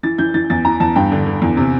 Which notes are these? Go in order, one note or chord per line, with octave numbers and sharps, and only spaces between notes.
E3 A6
E3 G6
E3 A6
E2 A6
E3 A#5
E2 A5
G2 G5
D3
D3
E2
C3